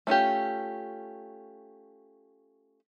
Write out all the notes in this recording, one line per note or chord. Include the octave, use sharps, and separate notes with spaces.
A3 C#4 F4 G4